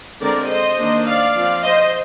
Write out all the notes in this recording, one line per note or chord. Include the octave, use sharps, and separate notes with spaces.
D3 G#3 C4 A#4 D5
C5 D#5
D#3 A#3 D4
D5 F5
F3 C4
C5 D#5